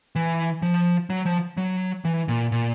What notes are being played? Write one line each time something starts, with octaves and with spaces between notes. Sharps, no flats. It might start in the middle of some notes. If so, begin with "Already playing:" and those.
E3
F3
F#3
F3
F#3
E3
A#2
A#2